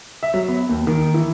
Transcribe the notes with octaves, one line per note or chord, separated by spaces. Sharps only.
E5
F#3
B3
D#2
D#3
E3